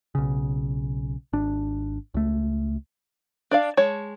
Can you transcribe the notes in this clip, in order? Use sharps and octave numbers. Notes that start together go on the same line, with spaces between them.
B1 C#3
G#1 D4
C#2 A3
D4 D5 F5
G#3 C#5 A5